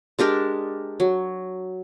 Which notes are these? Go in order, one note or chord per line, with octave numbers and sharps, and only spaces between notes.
G#3 D4 G4 A#4
F#3